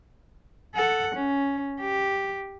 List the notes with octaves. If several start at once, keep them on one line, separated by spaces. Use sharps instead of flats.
A4 F#5
C#4
G4